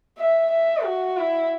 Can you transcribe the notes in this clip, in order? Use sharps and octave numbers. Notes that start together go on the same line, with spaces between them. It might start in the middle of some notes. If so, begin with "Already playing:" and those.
E5
E5
F#4
E4